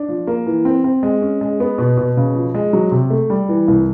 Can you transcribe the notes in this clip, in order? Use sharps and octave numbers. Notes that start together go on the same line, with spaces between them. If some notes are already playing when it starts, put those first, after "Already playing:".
Already playing: D4
F3
A#3
E3
C4
C4
G#3
C#4
G#3
B3
B2
B2
C#3
F3
G#3
F#3
C3
A3
G3
E3
C2